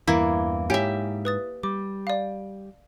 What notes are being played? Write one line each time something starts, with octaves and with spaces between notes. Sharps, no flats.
E2 G2 E3 A#3 E4
G#2 G4 C#5 E5 G5 G#5
B4 D#6 A6
G3 D6
D5 F5